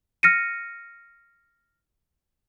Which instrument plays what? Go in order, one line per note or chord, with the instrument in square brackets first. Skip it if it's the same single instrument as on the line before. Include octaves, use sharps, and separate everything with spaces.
[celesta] F6 A#6 C#7 D#7